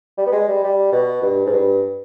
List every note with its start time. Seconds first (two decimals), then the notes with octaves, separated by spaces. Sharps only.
0.18 G3
0.26 B3
0.32 G#3
0.48 G3
0.63 G3
0.92 B2
1.22 G2
1.46 G#2
1.53 G2